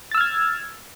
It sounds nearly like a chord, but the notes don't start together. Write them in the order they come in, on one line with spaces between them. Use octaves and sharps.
A6 E6 F6 G#6